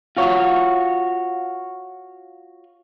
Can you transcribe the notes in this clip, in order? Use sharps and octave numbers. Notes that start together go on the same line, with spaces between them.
F4 F#4 C#5 F5